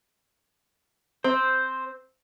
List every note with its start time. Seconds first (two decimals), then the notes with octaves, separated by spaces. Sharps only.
1.24 C4 C5